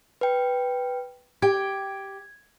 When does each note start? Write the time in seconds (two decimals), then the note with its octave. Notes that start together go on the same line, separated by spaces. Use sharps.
0.21 B4 G5
1.42 G4 G5 G#6